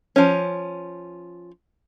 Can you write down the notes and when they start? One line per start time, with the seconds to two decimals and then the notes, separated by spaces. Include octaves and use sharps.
0.16 F3 C#4